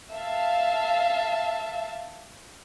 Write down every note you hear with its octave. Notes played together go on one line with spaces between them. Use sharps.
E5 F5 A5